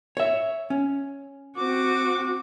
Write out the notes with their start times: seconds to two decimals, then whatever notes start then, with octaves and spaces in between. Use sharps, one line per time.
0.17 C#5 E5
0.70 C#4
1.57 C4 F#4 D6